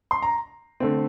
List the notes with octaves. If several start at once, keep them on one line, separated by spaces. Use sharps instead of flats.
C6
A#5
D3 A3 C4